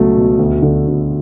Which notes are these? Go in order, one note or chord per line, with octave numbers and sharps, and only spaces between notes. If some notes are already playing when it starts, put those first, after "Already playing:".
Already playing: C#2 B2 F#3 A3
B2
D2
D3
D2